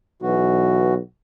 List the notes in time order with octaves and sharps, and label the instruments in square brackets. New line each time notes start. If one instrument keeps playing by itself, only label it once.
[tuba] B1 [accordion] E3 F#4